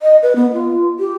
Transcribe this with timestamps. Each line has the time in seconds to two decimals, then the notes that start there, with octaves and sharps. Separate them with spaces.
0.02 D#5
0.22 B4
0.36 B3
0.53 F4
0.99 G4